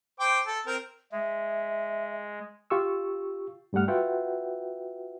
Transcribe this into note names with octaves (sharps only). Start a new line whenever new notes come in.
C5 G5 D6
A4
C4 A#4
G#3 E5
F4 G4 C#6 E6
G2 G3 A3 F#5 F6
F4 F#4 B4 E5 F#5 G5